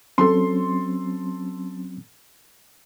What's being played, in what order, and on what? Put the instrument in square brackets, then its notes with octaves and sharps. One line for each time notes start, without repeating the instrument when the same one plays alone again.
[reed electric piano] F#3 C4 C#4 [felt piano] A4 C6